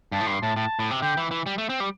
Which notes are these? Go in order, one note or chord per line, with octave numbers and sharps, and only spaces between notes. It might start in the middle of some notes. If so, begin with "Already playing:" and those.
G2 A5
A2
G2 C6
A2 A5
A2 A5
A2
C3
D3 G5
E3
E3
G3
A3
C4
G3